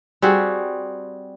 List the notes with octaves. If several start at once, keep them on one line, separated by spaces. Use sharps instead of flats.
G3 C4 F#4 G#4